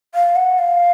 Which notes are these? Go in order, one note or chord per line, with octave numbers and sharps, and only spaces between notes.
F5
F#5
F5